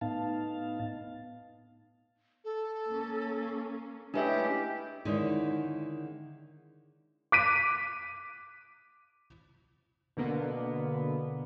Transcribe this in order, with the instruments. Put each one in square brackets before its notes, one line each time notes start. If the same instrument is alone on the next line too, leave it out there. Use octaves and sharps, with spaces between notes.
[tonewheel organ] A2 B3 D#4 F5 A5
[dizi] A4
[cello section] A#3 C#4
[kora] G#3 A3 C#4 [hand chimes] D4 B4 E5 [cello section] E4 [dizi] G4
[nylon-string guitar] D3 D#3 G#3 C#4 D#4 E4
[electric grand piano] D6 F#6 B6 D7 D#7
[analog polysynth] B2 D3 A#3 B3